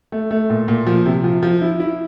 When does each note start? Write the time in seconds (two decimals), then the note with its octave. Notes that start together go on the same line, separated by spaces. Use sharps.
0.12 A3
0.31 A3
0.50 A#2
0.68 A#2
0.87 F3
1.06 C3
1.24 F3
1.43 F3
1.61 E4
1.80 E4